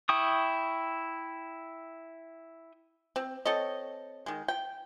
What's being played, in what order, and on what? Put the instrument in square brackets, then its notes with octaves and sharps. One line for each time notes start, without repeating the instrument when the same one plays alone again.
[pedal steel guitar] E4 G5 C#6 D#6
[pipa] C4
C4 A4 C#5 D#5
D#3 G#3
G5